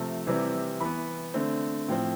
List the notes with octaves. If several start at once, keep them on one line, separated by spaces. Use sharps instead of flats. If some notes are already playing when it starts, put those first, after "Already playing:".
Already playing: C3 F3 A3 C4 A5
C3 E3 G3 C4
E3 B3 B5
D3 A3 C4
A2 F3 C4 G5